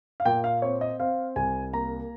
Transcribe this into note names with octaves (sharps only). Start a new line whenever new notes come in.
F5
A#2 G5
F5
C4 C#5
D#5
C4 F5
C2 G#5
A#3 A#5